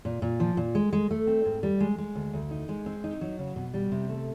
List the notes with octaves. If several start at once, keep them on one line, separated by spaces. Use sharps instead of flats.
A#2
A#2
F3
A#2
G#3
G#3
A3
C4
G#2
G3
G#3
G#3
D2
D2
D#4
G#3
C4
D#4
F#3
C#3
B2
G3
C3
A3